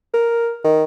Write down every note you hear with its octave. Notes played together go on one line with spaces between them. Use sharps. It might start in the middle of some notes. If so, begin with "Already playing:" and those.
A#4
D#3